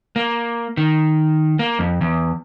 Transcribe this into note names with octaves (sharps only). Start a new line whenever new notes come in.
A#3
D#3
A#3
F2
E2